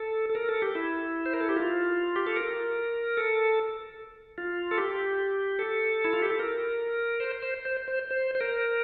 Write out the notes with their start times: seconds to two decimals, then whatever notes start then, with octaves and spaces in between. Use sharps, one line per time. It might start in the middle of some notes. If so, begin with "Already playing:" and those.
Already playing: A4
0.30 A4
0.35 A#4
0.49 A4
0.62 G4
0.75 E4
1.26 C5
1.33 A#4
1.40 A4
1.49 G4
1.56 F4
2.16 G4
2.27 A4
2.36 A#4
3.17 A4
4.38 F4
4.71 A4
4.78 G4
5.59 A4
6.04 E4
6.13 F4
6.22 G4
6.30 A4
6.40 A#4
7.20 C5
7.43 C5
7.65 C5
7.88 C5
8.11 C5
8.35 C5
8.41 A#4